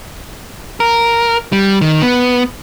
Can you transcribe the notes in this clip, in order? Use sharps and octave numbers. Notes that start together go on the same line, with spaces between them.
A#4
G3
D#3
B3